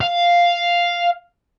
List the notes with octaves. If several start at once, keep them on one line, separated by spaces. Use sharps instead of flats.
F5